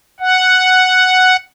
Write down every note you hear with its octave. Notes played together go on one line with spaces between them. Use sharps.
F#5